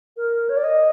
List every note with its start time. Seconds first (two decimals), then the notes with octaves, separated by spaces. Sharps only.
0.17 A#4
0.49 C#5
0.57 D5
0.64 D#5